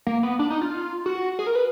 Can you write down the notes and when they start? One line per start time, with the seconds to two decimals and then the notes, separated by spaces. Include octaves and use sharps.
0.07 A#3
0.23 B3
0.39 D4
0.50 D#4
0.61 F4
1.06 F#4
1.39 G#4
1.47 A#4
1.55 B4